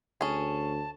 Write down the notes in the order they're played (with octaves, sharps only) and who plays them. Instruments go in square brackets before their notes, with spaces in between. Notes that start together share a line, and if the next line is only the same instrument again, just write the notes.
[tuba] D2 [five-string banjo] C#4 G#4 [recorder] A5